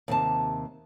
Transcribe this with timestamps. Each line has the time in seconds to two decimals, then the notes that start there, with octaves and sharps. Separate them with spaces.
0.08 D#2 C3 A5